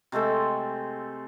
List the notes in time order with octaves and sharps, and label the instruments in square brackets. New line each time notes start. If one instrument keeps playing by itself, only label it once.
[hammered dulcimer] C3 G#3 A3 A4